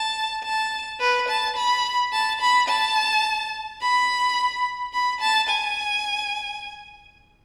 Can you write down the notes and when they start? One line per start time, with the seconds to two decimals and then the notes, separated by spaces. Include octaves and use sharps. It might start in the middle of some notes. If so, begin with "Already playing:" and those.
Already playing: A5
0.44 A5
1.00 B4
1.28 A5
1.56 B5
2.13 A5
2.41 B5
2.68 A5
3.81 B5
4.94 B5
5.21 A5
5.49 G#5